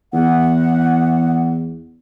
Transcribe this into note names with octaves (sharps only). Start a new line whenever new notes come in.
E2 F#5